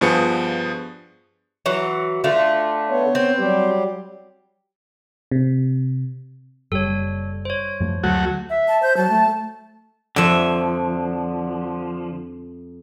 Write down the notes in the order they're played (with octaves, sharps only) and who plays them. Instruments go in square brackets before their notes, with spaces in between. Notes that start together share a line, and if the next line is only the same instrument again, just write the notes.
[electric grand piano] G2 F3 B3 G#4 C#7
[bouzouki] E3 F#3
D3 A3 F4
[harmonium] B3 C#5
[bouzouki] C4
[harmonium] F#3 G3 G4
[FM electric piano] C3
[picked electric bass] F#1 [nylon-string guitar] G3 [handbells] A4 C#5
[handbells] C5 C#5
[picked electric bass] F#2 F3 A3
[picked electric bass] D2 [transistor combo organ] F#3 A3 F#4
[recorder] E5
[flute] A5
[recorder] C5 [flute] G6
[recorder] F#3 [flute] A5
[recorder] A3
[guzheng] F2 E5 [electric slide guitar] D3 F3